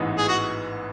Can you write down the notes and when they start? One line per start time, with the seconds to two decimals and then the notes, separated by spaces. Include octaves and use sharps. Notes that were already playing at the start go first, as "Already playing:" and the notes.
Already playing: A1 G#2 E3 B3 D#4
0.17 G#4
0.28 F#4